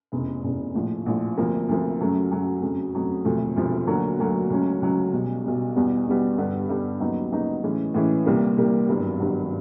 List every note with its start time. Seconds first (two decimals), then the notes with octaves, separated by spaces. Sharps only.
0.12 F1 E2 C#3
0.44 F1 E2 C#3
0.75 A#1 A2 F3
1.06 A#1 A2 F3
1.37 D2 C3 F3 A#3
1.69 D2 C3 F3 A#3
2.00 F#2 C#3 F#3 A3
2.31 F#2 C#3 F#3 A3
2.62 F2 C#3 F#3 A3
2.94 F2 C#3 F#3 A3
3.25 E1 D2 C3 F3 A3
3.56 E1 D2 C3 F3 A3
3.87 D2 D3 F#3 A#3
4.19 D2 D3 F#3 A#3
4.50 C#2 C#3 F#3 A3 C#4
4.81 C#2 C#3 F#3 A3 C#4
5.12 B1 B2 G3
5.44 B1 B2 G3
5.76 E2 B2 G3 B3
6.06 E2 B2 G3 B3
6.38 G2 D3 G3 B3
6.69 G2 D3 G3 B3
7.00 D#2 C#3 F#3 B3 D#4
7.32 D#2 C#3 F#3 B3 D#4
7.63 A2 E3 G#3 C#4
7.94 A2 E3 G#3 C#4
8.26 C2 A#2 G3 A#3
8.57 C2 A#2 G3 A#3
8.88 G#1 G2 D#3 F#3 B3
9.20 G#1 G2 D#3 F#3 B3